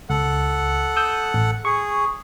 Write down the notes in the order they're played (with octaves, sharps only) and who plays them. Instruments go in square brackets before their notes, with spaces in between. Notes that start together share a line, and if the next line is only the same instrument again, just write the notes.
[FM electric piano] C#2 [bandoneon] A4 F#5 F#6
[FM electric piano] D#6 E6 G6
A1
[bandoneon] G#4 [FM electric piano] C#6